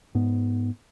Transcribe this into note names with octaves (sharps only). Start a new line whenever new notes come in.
G#2 B3